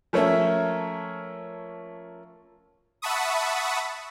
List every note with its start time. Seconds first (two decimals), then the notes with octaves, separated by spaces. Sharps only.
0.13 F3 A3 A#3 C#4 A#4 E5
3.02 E5 F#5 A5 B5 C#6 D#6